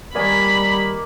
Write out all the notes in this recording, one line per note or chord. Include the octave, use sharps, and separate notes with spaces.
D#3 G3 A#3 A#4 D5 G#5 B5